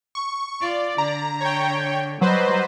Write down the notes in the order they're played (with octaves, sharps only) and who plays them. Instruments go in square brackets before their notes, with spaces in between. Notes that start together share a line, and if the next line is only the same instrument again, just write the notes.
[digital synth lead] C#6
[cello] F4 [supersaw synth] D5
[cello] D3 [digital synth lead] A#5
[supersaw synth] C#5 G5
[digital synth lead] F#3 [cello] G3 D#5 [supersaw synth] B4 C5